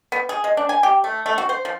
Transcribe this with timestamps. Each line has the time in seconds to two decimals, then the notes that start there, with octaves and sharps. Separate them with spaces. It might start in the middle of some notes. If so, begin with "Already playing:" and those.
0.12 B3
0.29 G#4
0.44 G#3
0.57 D4
0.69 G#5
0.83 G4
1.04 A3
1.26 A3
1.38 F#4
1.49 C5
1.65 F3